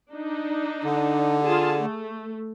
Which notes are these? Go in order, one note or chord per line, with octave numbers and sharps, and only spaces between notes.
D4 D#4
D3
F4 G#4 A5
A3